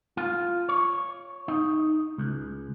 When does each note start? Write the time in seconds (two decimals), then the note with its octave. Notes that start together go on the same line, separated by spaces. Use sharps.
0.17 F4
0.69 C#5
1.48 D#4
2.18 C#2